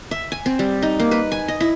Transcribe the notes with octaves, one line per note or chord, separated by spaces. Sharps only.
E5
G#5
C4
G3
D#4
A#3
B4
G#5
D#5
E4